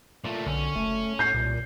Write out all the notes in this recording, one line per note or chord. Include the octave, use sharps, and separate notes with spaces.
A#2 A3 F4
B1 D3 C#4
F#1 A3
A2 G6 C7
C2 A#2